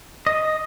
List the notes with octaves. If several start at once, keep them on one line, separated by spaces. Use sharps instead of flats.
D#5